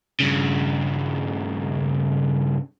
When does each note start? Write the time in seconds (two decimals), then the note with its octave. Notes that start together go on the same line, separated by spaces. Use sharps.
0.20 G2 C#3